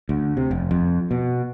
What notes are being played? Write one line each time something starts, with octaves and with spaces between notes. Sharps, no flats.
D2
C3
F1
F2
B2